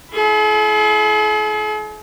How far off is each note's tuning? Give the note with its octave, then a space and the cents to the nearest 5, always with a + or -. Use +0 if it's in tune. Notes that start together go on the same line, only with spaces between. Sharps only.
E4 +30 G#4 +45